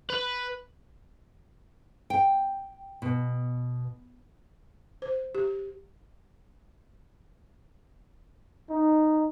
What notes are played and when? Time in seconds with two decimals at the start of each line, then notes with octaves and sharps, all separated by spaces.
0.10 B4
2.10 G5
3.02 B2
5.02 C5
5.35 G4
8.70 D#4